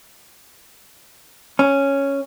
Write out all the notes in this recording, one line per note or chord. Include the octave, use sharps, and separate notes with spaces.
C#4